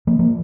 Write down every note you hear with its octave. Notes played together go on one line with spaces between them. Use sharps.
F3 A#3
F3 A#3